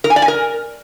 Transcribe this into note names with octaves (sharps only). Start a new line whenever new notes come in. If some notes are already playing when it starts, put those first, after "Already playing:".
A#4
G#5
D5
G#5
A#4